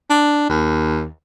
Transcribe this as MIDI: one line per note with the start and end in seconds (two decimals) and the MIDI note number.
0.10 0.47 62
0.49 1.07 39